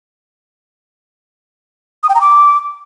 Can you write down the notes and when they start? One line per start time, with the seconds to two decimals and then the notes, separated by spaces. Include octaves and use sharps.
2.03 D#6
2.09 G5
2.15 A#5
2.21 D6